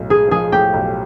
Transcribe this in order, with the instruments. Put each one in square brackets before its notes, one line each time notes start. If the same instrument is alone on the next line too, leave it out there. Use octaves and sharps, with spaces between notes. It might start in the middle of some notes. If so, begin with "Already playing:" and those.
Already playing: [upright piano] B1 A2
[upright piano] G#3 [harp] G#4
[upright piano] F3 [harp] G#4
[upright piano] A2 [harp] G4
[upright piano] B1